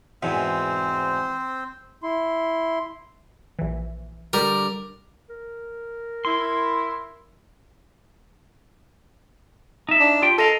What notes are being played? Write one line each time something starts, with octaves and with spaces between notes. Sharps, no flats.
E2 G#2 B2 C4 C5
E4 C6
A#1 E3
D3 G3 A#4 D5
A#4
E4 C6
D#4 E5
D4
F4 G4 G5
A4 A#4 D#5 F5